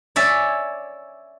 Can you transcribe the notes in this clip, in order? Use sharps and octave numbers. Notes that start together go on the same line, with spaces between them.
C#5 D5 E5 G#5